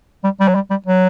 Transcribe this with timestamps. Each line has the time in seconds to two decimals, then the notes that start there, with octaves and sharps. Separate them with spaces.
0.24 G3
0.40 G3
0.48 F#3
0.55 G3
0.71 G3
0.86 F#3